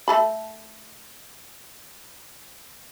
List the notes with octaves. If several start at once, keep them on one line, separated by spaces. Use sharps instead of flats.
A3 A4 B5